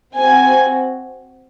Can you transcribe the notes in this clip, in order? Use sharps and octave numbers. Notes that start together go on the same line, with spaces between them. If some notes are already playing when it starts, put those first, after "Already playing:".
C4 F#4 G#5